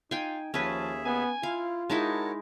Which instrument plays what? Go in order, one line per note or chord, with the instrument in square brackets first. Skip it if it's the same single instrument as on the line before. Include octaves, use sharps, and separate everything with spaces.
[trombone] D#4 [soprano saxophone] F4 [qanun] G5 G#5
[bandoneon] D#2 G#4 E5 [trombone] F3 [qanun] C#4 B4 [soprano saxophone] A5
[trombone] B3 [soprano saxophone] G#5
[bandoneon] E4 [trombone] F4 [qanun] F5
[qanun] G#3 D#4 E4 [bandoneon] F#4 A#4 C#5 [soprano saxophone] A5